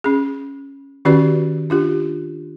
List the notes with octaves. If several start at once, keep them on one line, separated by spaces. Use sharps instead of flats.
C#4 G#4
D#3 C#4 F#4 G4 B4 D5
D4 F4 G4